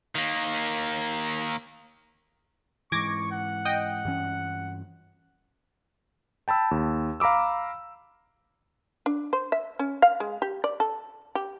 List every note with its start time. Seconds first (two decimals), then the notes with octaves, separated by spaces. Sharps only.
0.15 D#3 A#3
2.92 G#2 E3 C#6 D6 G#6 A#6
3.32 F#5
3.65 D#5 G5
4.05 G2 E3 C#4
6.48 G5 A5 B5 E6
6.71 D#2
7.20 F5 A#5 B5 D6 E6
9.06 D4
9.33 C5
9.52 E5
9.79 C#4
10.02 F5
10.20 G#3
10.42 G4
10.64 D5
10.80 A4
11.35 G4